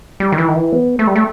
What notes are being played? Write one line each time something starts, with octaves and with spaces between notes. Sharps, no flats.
G3
D#3
E3
D#3
E3
B3
A3
G3
A3